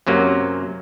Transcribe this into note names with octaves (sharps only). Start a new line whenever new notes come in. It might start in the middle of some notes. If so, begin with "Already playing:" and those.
F#2 C3 F#3 A#3